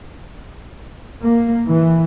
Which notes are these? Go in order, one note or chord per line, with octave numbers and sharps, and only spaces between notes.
A#3
E3